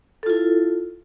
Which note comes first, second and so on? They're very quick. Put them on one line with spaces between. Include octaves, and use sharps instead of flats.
A4 F4 E4